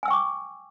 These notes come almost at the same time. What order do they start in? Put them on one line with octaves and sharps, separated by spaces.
G#5 E6 G5 C#6 D6